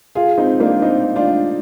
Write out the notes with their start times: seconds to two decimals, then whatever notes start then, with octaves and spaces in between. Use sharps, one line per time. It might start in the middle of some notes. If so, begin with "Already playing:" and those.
0.15 F4 G#4
0.38 C4 D#4
0.60 A#3 D4
0.82 C4 D#4
1.16 D4 F4